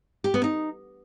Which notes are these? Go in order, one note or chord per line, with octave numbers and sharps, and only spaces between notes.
G4
B3
D#4